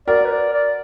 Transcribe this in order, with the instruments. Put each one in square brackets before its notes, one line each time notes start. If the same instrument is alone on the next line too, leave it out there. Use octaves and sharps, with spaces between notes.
[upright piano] F#4 A#4 [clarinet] D5
[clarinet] B4
D5
D5